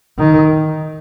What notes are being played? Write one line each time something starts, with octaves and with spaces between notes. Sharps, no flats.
D#3